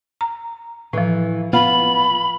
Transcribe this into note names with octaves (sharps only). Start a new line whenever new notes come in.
A#5
A2 E3 F3
B3 F4 F5 B5